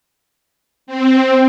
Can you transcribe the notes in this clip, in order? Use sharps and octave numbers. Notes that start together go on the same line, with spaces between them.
C4